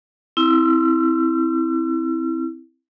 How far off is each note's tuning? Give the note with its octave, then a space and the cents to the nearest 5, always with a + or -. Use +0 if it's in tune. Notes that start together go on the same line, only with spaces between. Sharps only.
C4 +0 E4 -10 E6 +40